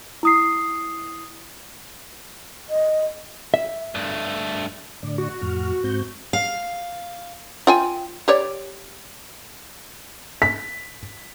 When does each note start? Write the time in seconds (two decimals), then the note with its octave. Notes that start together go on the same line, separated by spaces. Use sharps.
0.23 E4 D#6 C7
2.70 D#5
3.54 E5
3.95 G2 A3
5.03 A2 D3 D5
5.18 F#4
5.42 F2 A2 F6
5.84 G#2 C4 G6
6.33 F5
7.67 F4 G5 G#5
8.28 G4 C#5 D5
10.42 B6